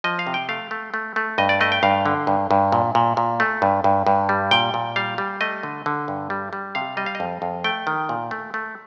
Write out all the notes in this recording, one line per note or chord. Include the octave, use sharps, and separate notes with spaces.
F3 D#5
F5
C3
G5
A3 F5
A3
A3
A3
G2 D#5
D5
A3 D#5
G5
G2 F5
D3
G2
G2
A#2
A#2
A#2
A3
G2
G2
G2
G3
A#2 G5
A#2
G3 F5
G3
A3 D#5
D3
D3
G2
G3
G3
C3 F5
G3 D#5
F5
D#5
F2
F2
A3 G5
D#3
A#2
A3
A3